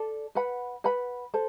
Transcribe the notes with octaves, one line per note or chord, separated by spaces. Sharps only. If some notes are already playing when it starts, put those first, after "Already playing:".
Already playing: A4 D5 A5
B4 F#5 B5
B4 F#5 B5
A4 C5